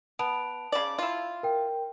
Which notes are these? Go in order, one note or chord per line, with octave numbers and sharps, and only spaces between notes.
B3 A5 D7 F7
C#3 D5
E4 F4
A#4 G5